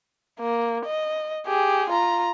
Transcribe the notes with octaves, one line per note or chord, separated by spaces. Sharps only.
A#3
D#5
G4 G#4
F4 A#5